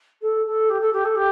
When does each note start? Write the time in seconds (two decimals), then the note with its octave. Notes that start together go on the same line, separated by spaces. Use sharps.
0.21 A4
0.46 A4
0.69 G4
0.80 A4
0.92 G4
1.04 A4
1.15 G4